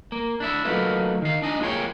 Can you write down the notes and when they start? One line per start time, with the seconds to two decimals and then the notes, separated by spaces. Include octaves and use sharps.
0.12 A#3
0.40 D4 E4 E5
0.65 F#3 A3 A#3 D#4 F4 B4
1.22 D#3 F5
1.42 D4 D#4 D#5 G#5
1.61 A#3 F4 G#4 A4 C#5 G5